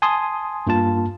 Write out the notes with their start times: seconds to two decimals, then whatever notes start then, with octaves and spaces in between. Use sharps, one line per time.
0.02 G#5 A5 C6 D#6
0.67 G2 A#3 F4 A5